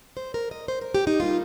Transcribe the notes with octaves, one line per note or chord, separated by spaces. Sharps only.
C5
A#4
D#5
C5
A#4
G4
D#4
G3 A#3 D#4 F4